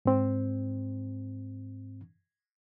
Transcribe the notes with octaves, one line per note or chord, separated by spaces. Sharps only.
G#2 C4